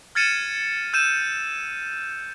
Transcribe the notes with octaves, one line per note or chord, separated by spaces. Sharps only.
F6 G#6 A6 C#7 D#7 E7
E6 G6 D#7 E7